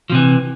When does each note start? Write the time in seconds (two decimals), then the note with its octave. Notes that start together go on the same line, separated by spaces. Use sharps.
0.10 F3
0.12 C3
0.15 E3